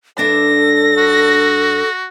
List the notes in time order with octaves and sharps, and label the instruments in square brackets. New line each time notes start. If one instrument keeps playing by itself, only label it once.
[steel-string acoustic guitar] G2 D4 E5 [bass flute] A4 [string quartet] A#6
[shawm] F#4